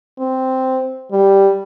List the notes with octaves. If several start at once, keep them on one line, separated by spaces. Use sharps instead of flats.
C4
G3